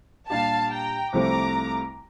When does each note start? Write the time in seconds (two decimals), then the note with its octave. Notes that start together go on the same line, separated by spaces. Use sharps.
0.29 A#2 G3 D4 G4 F5 A5
0.71 G5 A#5
1.12 C2 C3 F3 A3 C4 A#5 D6